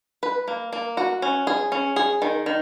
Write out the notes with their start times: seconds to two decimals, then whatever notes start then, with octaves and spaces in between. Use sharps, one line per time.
0.23 B4
0.48 A#3
0.73 A#3
0.97 F#4
1.22 C#4
1.47 G#4
1.72 C#4
1.96 G#4
2.22 D#3
2.46 D#3